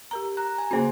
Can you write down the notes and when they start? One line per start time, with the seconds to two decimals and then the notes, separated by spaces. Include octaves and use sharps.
0.11 G4 A#4 A#5
0.37 A#5 F#6
0.58 G#5
0.71 C#3 A#3 C#4 F#4 G#4 C5